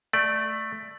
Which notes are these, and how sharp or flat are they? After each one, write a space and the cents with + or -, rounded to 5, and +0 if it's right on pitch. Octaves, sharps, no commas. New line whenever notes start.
A3 +0 D5 +15